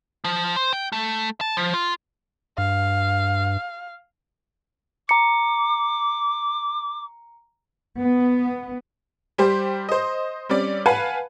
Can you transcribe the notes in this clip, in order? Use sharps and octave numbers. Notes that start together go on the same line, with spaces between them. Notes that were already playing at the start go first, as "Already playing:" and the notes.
F3
C5
G5
A3
A5
F3
F4
G2 F5
A#5 D6 C#7
B3
G3 G4 C5
C5 D#5
G3 C4 C#4 D5
B4 F5 F#5 G#5 A5 B5